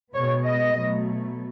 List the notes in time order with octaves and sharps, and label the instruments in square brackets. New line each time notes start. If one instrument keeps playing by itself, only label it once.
[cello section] B2 G#3 B3 C#5
D#5
B2 F#3 A3